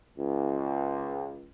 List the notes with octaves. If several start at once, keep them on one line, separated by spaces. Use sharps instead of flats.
C#2